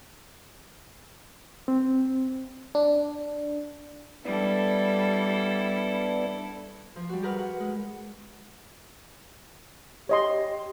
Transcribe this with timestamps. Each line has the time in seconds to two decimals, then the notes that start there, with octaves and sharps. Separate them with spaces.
1.68 C4
2.75 D4
4.25 G3 B3 D4 E4 A4
6.96 F3
7.09 G3 F#4
7.23 G4 G#4 A#4 B4 F#5 F6
7.38 F#5
7.60 G#3
10.09 G4 C#5 D#5 C6